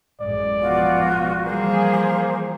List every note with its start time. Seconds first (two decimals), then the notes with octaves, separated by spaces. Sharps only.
0.20 A1 F#2 G#3 D5
0.61 B2 F3 F4 F#4
1.43 E3 F3 G3 A#3 G#4 C5